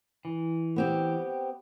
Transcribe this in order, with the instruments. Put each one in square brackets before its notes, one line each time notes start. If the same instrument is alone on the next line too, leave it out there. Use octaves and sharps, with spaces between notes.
[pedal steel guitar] E3
[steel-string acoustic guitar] B3 C4 G4